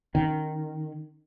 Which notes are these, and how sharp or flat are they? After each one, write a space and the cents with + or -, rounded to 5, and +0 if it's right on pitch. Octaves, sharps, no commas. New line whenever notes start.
D#3 -10 C#4 +0